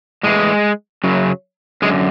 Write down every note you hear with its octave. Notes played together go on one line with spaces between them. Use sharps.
A2 E3 G#3
F#2 C#3 F#3
F#2 D3 G#3